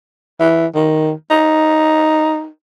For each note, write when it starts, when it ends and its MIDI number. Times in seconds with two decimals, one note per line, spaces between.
0.40 0.66 52
0.75 1.12 51
1.31 2.47 63